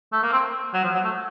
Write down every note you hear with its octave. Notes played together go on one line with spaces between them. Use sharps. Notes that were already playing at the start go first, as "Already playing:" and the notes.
A3
A#3
C4
F#3
F3
F#3
A3